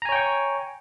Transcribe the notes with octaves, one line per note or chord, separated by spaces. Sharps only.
C#5 G5 G#5 A#5 C#6